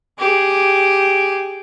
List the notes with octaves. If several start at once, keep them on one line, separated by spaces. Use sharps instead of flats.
G4 G#4